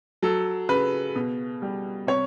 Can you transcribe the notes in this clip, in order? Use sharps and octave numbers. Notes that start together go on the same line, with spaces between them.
F#3 A4
C#3 B4
B2
G3
C3 C#5